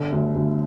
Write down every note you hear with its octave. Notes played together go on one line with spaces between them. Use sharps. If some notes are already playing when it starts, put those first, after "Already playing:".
Already playing: G1 D3
D2
D2